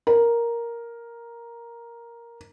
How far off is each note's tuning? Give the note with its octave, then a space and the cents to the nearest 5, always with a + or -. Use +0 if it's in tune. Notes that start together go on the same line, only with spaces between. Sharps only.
A#4 +5